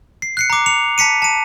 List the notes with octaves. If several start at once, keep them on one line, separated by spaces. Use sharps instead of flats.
C7
F#6 C7 C#7
A#5 D6
C#7 F7
A5 B6 C#7 D#7
A5 D#7